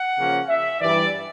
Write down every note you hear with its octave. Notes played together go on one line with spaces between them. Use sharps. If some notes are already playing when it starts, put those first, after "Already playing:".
Already playing: F#5
C#3 F3 A#3 C#4
E5
G2 E3 G3 D5